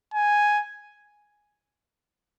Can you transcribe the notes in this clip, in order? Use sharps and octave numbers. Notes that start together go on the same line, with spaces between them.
G#5